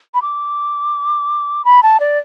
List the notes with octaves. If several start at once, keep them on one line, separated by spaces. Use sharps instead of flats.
B5
D6
B5
A5
D5